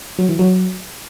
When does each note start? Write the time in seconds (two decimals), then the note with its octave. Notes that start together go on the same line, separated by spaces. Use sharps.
0.19 F#3
0.29 E3
0.39 F#3